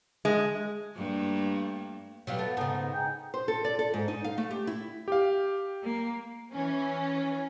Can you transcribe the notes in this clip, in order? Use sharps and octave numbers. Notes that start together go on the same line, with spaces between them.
G#3
G2 A3 A#3
F#3 G3 B3 F4
A3 A5
G#2 C#3 D#4
D#4 G#4 G5
C5
A4
D5
A4
G#2
D#4
F5
A3
G4
E4
G4 F5
A#3
E3 C#4